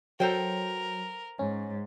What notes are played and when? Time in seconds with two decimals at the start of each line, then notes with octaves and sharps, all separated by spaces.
0.20 F#3 A4 A#4 C5 G5
1.39 G#2 C#4